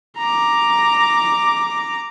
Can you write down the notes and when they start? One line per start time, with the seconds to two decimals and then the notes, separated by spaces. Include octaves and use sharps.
0.18 A#5 D6